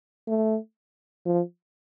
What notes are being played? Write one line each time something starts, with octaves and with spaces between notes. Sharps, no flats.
A3
F3